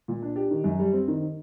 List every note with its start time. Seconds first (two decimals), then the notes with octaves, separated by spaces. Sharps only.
0.08 A#2
0.22 D4
0.36 G4
0.51 D#3
0.64 F#2
0.79 G3
0.93 C4
1.08 D#3